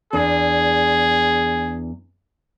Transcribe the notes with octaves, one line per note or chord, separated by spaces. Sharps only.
E2 D4 G#4